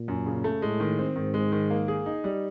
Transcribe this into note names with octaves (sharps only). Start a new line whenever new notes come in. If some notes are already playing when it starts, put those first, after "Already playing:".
Already playing: A#2
F#2
C#3
A3
A2 G#3
D#3
C4
G#2 D#3
G#3
D#3
A#3
G#4
D#4
G3